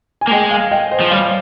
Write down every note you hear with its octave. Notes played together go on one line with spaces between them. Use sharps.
G#5
A#3
G#3 D#5 G5
F5 G#5
D#5 G5
C5 D#5
F3
G3 C#5 F5